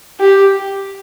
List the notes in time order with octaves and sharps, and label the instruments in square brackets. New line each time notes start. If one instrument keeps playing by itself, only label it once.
[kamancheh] G4